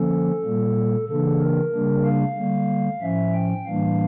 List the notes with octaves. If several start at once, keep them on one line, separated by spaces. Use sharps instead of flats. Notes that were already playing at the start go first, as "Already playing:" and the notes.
Already playing: D3 F3 A#3 C#4 A4
A#2 G3 A#3
C#3 E3 A#3 D4 A4
A#4
C#3 G3 A#3 D4
F5
D3 G3 A#3
A2 F3 C#4 E5
G5
A2 E3 G3 A#3 D4 F5